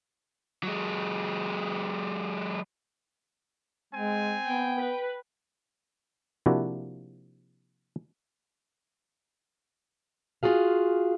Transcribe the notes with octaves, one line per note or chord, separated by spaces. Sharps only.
F#3 G#3
G#3 C4 G#5
B3 G5
B4
C3 F3 A#3 D4 E4 F#4
F4 F#4 G#4 F5